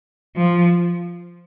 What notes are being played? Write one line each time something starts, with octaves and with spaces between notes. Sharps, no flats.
F3